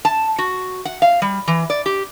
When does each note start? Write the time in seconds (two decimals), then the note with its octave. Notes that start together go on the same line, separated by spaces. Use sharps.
0.05 A5
0.38 F#4
0.85 F#5
1.02 F5
1.22 G3
1.48 E3
1.70 D5
1.86 G4